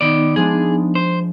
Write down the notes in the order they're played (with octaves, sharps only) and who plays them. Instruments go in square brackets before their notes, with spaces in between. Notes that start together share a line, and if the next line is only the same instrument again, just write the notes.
[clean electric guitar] D#3 D5 [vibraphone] B3 D#4
[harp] F3 G#3 D4 [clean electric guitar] G#4
[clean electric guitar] C5